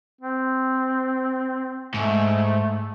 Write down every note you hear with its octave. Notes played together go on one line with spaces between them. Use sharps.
C4
G#2 A3